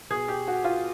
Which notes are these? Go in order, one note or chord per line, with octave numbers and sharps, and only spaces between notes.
B2 G#4
G4
F#4
F4